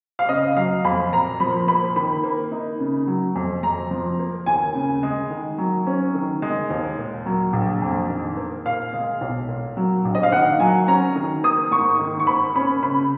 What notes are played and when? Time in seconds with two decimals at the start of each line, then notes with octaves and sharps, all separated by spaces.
0.19 F5
0.29 C#3 D#5
0.57 F#3 F5
0.84 F2 B5
1.13 A#2 A#5
1.40 F3 B5
1.68 A#3 B5
1.96 D#3 B5
2.23 A#3
2.52 D#4
2.80 C#3
3.07 F#3
3.35 F2
3.63 F2 A#5
3.91 F3
4.19 A#3
4.46 D#2 G#5
4.75 C#3
5.03 G#3
5.30 D#3
5.58 F#3
5.87 C#4
6.14 D#3
6.42 G#3
6.70 D#2
6.98 A#2
7.26 F#3
7.53 A#1
7.82 F2
8.09 D#3
8.37 A#3
8.65 A#2 F5
8.93 G#3
9.21 B1
9.49 A#2
9.77 F#3
10.05 A#1
10.15 D#5
10.23 F5
10.32 D#3 F#5
10.60 F#3 G#5
10.88 C#4 A#5
11.15 D#3
11.44 A#3 D#6
11.71 G#2 C#6
11.99 D#3
12.20 C#6
12.27 A#3 B5
12.56 C#4 B5
12.83 C#3 B5